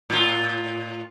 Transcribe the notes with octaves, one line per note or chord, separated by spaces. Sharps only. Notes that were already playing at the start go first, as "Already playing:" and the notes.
A2 F4